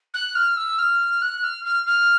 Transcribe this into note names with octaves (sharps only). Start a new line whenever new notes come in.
F#6
F6
E6
F6
F#6
F6
F6
F6